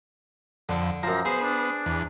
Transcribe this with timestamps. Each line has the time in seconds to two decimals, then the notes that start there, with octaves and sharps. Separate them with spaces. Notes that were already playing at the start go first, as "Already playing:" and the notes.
0.69 F2 D3 D4
1.03 F#2 F3 A#5
1.25 B3 G#4 C5
1.43 D4
1.86 E2